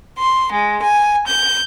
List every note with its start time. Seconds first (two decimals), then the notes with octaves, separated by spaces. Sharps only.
0.19 C6
0.52 G#3
0.82 G#5
1.27 G6